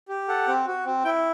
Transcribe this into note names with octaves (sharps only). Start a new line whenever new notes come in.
G4
A4 F#5
C4
F#4
C4
E4 G5